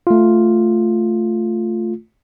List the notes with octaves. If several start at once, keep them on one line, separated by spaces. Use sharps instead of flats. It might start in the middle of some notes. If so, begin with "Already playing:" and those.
A3 F4